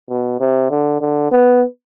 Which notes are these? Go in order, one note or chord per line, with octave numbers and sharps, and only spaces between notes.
B2
C3
D3
D3
B3